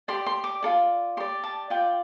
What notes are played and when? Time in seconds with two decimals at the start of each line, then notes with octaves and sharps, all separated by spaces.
0.08 G4 D5 C6
0.26 C6
0.44 D6
0.63 F4 A4 D5
1.17 G4 C6
1.20 D5
1.44 A5
1.70 F4 D5 G5